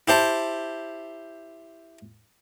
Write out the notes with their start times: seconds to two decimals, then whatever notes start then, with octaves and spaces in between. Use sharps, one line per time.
0.08 E4 G4 C5 A5